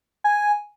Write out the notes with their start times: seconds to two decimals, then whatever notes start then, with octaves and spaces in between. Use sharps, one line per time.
0.24 G#5